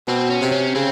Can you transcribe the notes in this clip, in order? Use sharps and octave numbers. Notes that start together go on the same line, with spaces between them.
B2 C4
C#4
C3
C#4
C#3 C4